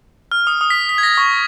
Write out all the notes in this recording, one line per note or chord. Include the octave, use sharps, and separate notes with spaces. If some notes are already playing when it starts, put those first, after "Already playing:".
F6
D#6
D#6
B6
B6
G#6
A#6
C#6